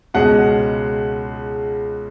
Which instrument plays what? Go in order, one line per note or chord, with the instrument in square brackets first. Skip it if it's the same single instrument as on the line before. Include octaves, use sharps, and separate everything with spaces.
[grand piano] C#2 B2 G#3 C#4 F#5